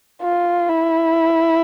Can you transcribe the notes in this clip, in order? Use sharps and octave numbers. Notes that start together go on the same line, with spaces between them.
F4
E4